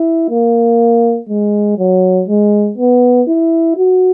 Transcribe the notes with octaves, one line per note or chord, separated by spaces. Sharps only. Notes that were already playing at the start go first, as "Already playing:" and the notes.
Already playing: E4
A#3
G#3
F#3
G#3
B3
E4
F#4